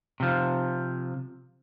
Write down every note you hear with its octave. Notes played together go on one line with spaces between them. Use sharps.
C3 F3